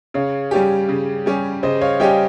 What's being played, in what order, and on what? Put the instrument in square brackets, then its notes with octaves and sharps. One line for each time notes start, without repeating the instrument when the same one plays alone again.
[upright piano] C#3 [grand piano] C#5 F5
[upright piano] G3 C#4 G4
C#3
G3 C#4 G4
[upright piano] C#3 [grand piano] C5 D#5
[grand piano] C#5 F5
[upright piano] G3 C#4 G4 [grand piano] D#5 G5